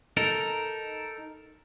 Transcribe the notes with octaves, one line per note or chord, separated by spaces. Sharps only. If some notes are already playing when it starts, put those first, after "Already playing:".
D#4 A4 A#4